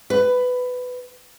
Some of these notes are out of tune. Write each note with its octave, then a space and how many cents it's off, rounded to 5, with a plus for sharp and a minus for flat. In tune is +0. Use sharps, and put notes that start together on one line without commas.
B4 +15